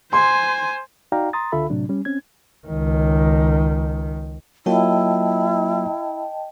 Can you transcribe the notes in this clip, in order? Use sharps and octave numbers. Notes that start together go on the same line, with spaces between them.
C5 G#5 C6
D#4 F#4 D5 F5 G5 A#5
A#5 C6 D#6 A6
C#2 D3 F4 A4 E5 B5
A2 C3 F#3 D4
G3 C#4
C4 C#4 G#6
C#2 D#3
F#3 A#3 E4 F4 D#5 G5 A5